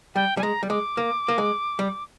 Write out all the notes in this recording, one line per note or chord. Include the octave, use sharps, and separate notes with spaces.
G3 G5
G3 G#5
G#3 A#5
G3
G#3 D6
A#3
A#3
G#3
G3